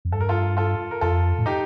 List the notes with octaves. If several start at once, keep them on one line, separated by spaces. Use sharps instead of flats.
F2
G2 A4
A#4
F4 A4
F4 A4
A#4
F2 F4 A4
A2
D#4 G4